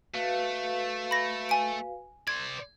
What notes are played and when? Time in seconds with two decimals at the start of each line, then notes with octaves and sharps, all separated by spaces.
0.14 A3 F#4 B4 F5
1.11 B5 A#6
1.49 G#5 D7
2.27 C5 D5 G#6